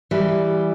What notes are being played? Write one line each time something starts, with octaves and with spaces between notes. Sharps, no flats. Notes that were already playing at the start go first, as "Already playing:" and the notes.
E3 G3